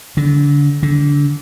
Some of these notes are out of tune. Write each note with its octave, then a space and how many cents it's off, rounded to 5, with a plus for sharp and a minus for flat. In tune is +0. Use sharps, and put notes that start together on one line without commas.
D3 -30
D3 -25